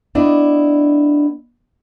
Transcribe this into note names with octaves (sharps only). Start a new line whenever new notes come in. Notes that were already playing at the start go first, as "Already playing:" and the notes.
B3 D4 E4 D5 D#5